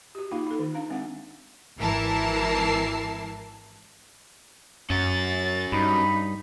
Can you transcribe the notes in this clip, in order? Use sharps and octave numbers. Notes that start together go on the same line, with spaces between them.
F#4 G4
A#3 D#4 F4 F#4 F5
D#4 A4
D#3
D4 F5 A#5
G#3 C4 F#4 F#5
G#1 E3 E4 A#4 A5 C7
F#2 C#4 F#4 A6
G2 D#4 B5